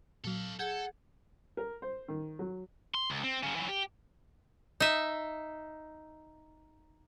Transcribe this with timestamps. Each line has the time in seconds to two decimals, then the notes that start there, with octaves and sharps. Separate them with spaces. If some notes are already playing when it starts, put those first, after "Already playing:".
0.24 A#2 F#3 A4 F5
0.59 G#4 A4 F#5 G6 G#6
1.57 A#4
1.82 C5
2.08 D#3
2.39 F#3
2.95 C6
3.10 C#2
3.24 C4
3.43 C#3 F#3
3.56 E3 F#3
3.69 G4
4.80 D#4 E5